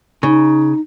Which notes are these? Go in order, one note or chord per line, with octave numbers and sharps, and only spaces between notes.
C#3 D#4